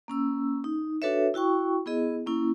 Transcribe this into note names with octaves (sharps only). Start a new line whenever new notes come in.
A#3 C#4 E6
D#4
D4 F#4 A4 B4 C#5 E5
E4 F#4 G5 C#6
B3 E4 G#4 D#5
A#3 C#4 E4